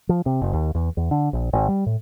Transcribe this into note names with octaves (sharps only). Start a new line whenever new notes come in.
F3
C3
F#1
D#2
E2
E2
D3
A#1
G#1
G3
A2